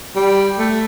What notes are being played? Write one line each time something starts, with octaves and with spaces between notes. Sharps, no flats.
G3
A3